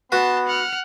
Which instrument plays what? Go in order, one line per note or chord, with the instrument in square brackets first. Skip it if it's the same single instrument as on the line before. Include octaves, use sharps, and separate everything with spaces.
[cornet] B3 [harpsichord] F#4 B4 [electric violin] A5 C6
[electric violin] F#5 F6